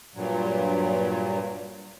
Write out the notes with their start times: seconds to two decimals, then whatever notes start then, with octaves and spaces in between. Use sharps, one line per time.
0.15 G2 A#2 F#3